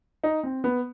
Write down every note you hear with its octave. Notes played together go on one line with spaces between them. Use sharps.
D#4
C4
B3